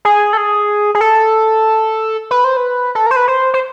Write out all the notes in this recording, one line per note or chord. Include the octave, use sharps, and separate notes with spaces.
G#4
A4
G#4
G#4
A4
B4
C5
B4
A4
A#4
C5
B4
C5
C5